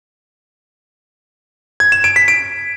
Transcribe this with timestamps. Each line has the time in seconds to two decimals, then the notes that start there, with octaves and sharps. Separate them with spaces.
1.80 G#6
1.92 E7
2.04 D7
2.16 B6
2.28 D7